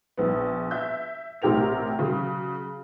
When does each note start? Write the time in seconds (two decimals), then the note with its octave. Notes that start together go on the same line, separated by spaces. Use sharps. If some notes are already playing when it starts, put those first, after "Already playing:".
0.17 A#1 B3
0.71 E5 G6
1.42 A1 C3 G4 A#4 F7
1.99 C#3 F#3